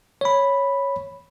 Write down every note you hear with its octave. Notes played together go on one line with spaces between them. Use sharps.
C#5 B5